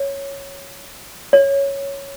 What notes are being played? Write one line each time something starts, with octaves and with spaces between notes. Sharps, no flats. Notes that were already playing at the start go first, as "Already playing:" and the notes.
Already playing: C#5
C#5